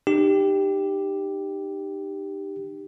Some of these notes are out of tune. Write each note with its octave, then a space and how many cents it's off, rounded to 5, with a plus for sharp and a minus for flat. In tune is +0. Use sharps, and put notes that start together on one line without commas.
D#4 -35 G4 +0